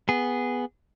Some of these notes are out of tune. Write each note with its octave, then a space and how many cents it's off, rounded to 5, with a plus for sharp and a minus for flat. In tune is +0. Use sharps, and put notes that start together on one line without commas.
B3 +0 G#4 -10